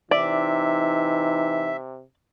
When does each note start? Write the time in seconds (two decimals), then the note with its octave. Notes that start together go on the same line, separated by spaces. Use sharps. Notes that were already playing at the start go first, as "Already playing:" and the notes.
0.11 C3 E3 D#4 D5 E5